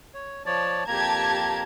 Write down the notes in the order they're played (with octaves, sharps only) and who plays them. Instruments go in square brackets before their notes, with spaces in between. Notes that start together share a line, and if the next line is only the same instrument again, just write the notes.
[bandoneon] C#5
[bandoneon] F3 C#5 D5 [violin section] A5
[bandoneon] F2 A#3 A#5 [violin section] G4 A5 G#6